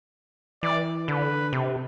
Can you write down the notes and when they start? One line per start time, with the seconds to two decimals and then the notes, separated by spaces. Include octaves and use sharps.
0.63 E3 D5
1.08 D3 B4
1.53 C3